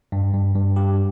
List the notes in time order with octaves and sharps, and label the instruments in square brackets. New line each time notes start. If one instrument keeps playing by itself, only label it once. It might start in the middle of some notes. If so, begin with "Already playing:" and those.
[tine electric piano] G2
G2
G2
G4